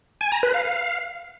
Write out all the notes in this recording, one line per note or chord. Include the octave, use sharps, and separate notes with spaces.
G#5
A#5
B4
F5
F5